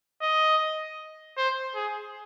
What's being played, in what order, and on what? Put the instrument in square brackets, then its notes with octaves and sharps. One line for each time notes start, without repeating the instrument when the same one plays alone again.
[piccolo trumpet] D#5
C5
G#4